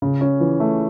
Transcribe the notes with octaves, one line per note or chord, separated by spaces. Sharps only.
C#3
C#4
E3
A3